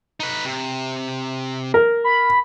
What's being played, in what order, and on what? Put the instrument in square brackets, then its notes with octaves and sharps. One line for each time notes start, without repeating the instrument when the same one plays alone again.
[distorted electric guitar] D#4 B4
C3
[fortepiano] A#4
[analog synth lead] B5